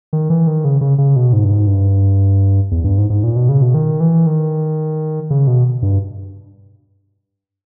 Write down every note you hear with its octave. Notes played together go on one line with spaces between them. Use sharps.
D#3
E3
D#3
C#3
C#3
C#3
B2
G#2
G2
G#2
G2
E2
G2
G#2
G#2
A#2
B2
C#3
B2
D#3
E3
D#3
C#3
B2
G2